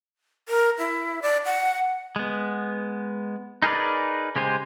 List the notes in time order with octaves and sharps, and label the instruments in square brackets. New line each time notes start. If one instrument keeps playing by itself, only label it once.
[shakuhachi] A#4
E4
D5
F#5
[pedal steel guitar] G#3 B3
D#4 G#4 A#4 B4 D5
C#3 G#3 G4 C5 G#5